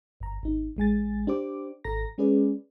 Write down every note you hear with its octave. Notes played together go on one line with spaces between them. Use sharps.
G1 A#5
G#1 D#4
A1 G#3 G#5 A6
D4 G4 C5 D6
G#1 A4 A#5 A#6
G#3 C#4 G#4 B4 D5